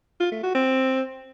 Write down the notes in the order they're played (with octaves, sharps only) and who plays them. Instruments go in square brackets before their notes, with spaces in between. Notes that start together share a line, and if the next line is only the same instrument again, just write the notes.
[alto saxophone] F4
A3
F#4
C4